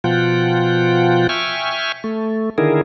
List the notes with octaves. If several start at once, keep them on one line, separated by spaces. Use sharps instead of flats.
B2 F3 F4 F#5 G5
E5 G5 G#5 C#6 F6
A3
D3 D#3 E4 G#4 A#4